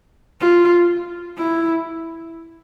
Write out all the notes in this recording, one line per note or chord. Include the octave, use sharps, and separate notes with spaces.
F4
E4